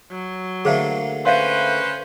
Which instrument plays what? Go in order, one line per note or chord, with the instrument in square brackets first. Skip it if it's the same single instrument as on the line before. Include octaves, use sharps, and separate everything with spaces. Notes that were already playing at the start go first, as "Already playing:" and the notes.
[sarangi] F#3
[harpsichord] D3 A3 A#3 [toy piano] G#4 C5 F5
[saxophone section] C#4 B4 [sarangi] C5 [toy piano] E5 F5 C6